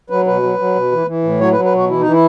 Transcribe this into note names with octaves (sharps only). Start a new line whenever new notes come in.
F#3 B4
B2 B4
F#3
F#3
B2
E3
E3
A2
F#3 C#5
B4
F#3
B4
B2 F#4
E3 E4
D#4
E3
E4